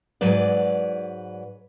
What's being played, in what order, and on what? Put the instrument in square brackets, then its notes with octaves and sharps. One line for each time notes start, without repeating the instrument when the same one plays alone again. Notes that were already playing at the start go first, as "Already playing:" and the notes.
[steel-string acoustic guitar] G#2 F#3 B4 D5